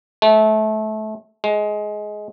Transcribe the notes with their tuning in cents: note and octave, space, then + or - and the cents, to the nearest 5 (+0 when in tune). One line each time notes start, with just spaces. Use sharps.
A3 -25
G#3 +15